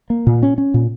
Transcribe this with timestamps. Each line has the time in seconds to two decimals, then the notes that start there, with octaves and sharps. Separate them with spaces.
0.10 A#3
0.27 A#2
0.43 C#4
0.58 C#4
0.74 A#2